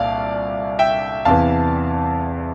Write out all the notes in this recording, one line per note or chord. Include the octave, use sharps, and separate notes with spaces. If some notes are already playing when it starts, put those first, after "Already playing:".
Already playing: C2 A#2 D5 F5 A5
E5 G5
E2 C3 E3 F5 A5